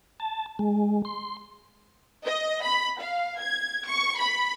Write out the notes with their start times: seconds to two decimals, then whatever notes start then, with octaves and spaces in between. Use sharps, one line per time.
0.20 A5
0.59 G#3
1.05 C6
2.25 D#5
2.64 B5
3.00 F5
3.41 G#6
3.87 C#6
4.19 B5